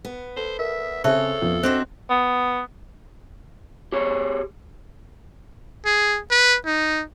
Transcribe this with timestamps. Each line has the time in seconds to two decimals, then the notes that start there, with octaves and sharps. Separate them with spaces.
0.05 B3
0.37 A4 C5
0.59 A#4 E5
1.04 C#3 C4 G#4 A4 C5 C#5 E5 A5
1.42 F2 F3 B3 C#4
1.63 C4 D4 F#4 C5 D#5
2.10 B3
3.92 G4 G#4 C#5
5.86 G#4
6.31 B4
6.66 D#4